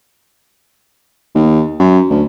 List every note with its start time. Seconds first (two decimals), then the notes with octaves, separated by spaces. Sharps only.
1.35 D#2
1.79 F#2
2.10 D2